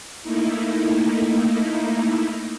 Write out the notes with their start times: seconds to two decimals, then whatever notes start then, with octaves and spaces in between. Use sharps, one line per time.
0.22 A3 A#3 D#4 E4